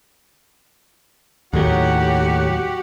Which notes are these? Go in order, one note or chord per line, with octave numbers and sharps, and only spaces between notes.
D#2 A2 F#3 F#4 G4 F#5